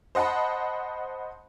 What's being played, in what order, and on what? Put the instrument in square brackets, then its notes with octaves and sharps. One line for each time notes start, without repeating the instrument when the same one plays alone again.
[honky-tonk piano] C5 D#5 F#5 A5 B5